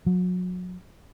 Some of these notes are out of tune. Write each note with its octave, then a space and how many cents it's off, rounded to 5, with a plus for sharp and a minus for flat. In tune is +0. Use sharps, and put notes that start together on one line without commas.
F#3 -35